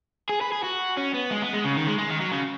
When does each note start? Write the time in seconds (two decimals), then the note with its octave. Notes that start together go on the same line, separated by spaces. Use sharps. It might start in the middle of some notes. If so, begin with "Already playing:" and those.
0.29 G#4
0.41 B4
0.52 G#4
0.63 F#4
0.97 C#4
1.14 B3
1.31 G#3
1.42 B3
1.53 G#3
1.64 C#3
1.76 D#3
1.87 G#3
1.98 G#3
2.09 D#3
2.20 F#3
2.32 C#3